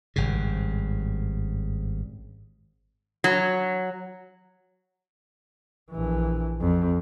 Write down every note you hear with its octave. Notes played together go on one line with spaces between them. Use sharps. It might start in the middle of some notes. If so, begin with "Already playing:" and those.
G#1 G2 C#3
F#3
A#1 E3
F2